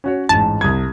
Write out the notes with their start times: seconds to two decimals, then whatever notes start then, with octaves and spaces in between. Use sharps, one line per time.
0.04 C#4 F#4 C#5
0.29 A1 G#2 A5
0.61 C2 D#6 G#6